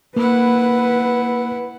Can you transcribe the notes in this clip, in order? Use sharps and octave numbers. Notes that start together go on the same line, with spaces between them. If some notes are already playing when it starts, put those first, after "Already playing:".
A#3 E4 B4 F#5